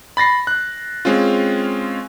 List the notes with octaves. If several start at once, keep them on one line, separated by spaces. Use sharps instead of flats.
B5 A6 A#6 C7
F#6
G#3 C4 C#4 F4